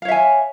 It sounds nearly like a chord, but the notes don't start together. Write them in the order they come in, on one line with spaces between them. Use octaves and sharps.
F5 C#5 E5 G#5